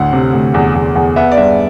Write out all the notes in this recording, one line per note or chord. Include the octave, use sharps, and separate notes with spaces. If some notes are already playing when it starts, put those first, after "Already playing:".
Already playing: D2 A2 F#5
C3
D2
E2
E2
E2
B3 E5
D5
G2 E5